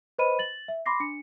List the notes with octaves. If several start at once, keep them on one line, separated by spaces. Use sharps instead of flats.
B4 C5 D#5 B5 D#7
A6 F#7
E5
B5 C6 D6 A#6 C7
D4 C#7